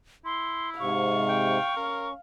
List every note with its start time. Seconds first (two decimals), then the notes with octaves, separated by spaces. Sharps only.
0.25 E4 C6
0.80 G#2 C3 F5 C#6
1.29 G5
1.77 C#4 A#4